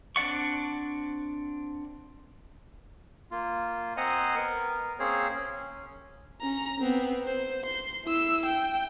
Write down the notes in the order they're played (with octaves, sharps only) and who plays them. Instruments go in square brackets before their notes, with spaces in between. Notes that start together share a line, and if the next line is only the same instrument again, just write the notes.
[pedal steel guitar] C4 D4 D5 F#5 C#6
[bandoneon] A#3 F4
C4 C5 D#5 F#5 G#5 A#5
B3 A#4
A#3 C4 C#4 G#4 C5 C#5
C#4
[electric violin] C#4 A#5
B3 C4
C5
C6
E4 E6
G5